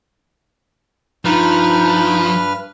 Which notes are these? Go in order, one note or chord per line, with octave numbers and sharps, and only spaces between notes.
G2 F3 D#4 B4 F6